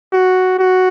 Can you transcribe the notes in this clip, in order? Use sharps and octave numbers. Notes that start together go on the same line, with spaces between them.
F#4
F#4